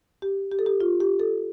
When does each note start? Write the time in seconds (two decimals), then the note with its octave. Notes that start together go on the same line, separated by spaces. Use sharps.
0.22 G4
0.51 G4
0.59 A4
0.66 G4
0.80 F4
1.00 G4
1.20 A4